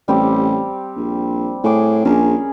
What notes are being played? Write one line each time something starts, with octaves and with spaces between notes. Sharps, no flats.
A1 G3 C4 G4
A#1
A2 G#4 D6
A#1 C#4 G#4 A#4